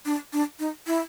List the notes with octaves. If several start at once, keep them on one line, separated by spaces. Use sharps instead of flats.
D4
D4
D#4
E4